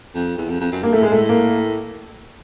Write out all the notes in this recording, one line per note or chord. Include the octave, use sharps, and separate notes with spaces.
F2
E2
F2
F2
F#2
G2 A#3
A2 A3
G#2 G#3
A#2 A3
A2
A#3